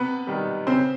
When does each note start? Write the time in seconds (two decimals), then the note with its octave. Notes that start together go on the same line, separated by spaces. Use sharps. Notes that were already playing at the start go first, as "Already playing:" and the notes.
Already playing: C3 B3 B4
0.27 D#3 G3
0.67 C#3 C4 C5